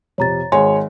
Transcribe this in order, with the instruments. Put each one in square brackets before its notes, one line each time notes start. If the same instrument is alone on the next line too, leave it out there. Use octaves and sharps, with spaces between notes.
[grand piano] F2 C3 [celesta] C#5 A#5 A6
[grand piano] G#1 [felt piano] G#4 C#5 [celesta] G#5 C6